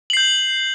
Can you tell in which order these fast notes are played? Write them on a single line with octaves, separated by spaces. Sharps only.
F#7 C7 G6